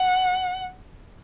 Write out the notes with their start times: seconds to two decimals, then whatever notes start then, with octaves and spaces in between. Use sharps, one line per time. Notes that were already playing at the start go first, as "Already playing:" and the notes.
Already playing: F#5